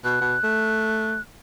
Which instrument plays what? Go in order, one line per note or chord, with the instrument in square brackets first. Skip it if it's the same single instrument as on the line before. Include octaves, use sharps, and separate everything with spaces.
[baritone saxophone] B2 [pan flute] F#6
[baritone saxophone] B2
A3